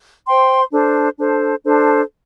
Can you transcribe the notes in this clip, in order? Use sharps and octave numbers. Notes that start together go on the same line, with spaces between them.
C5 G5 C6
D4 A4 C5
D4 A4 C5
D4 A4 C5